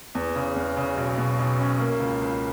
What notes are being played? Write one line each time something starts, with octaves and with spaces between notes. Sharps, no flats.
E2
C#3
E2
C#3
B1
B2
B1
C#4
A#3
C#2
C#2